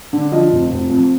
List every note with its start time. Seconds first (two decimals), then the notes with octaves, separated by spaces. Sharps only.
0.13 D3
0.32 F3 D#5
0.52 F1
0.71 F1
0.91 F2